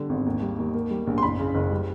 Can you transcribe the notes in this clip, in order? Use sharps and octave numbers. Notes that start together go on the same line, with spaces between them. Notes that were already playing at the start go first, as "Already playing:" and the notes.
Already playing: D3 G3
G#1
D#2
G3
D#2
A#3
G3
A#1
C6
F#1 B5
C#3
F#1
G3